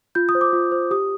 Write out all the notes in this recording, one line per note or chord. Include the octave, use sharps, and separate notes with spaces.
F4 G6
D#6
C5
D6
F4
C5
G4 D#6